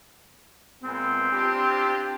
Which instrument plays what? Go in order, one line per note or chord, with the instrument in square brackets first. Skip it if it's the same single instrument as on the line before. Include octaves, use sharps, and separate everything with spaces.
[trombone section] A#2 G#3 B3 [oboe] C4
[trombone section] D4 F4 G4